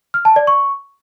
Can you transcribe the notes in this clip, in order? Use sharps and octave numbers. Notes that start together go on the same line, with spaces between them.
F6
A5
D5
C#6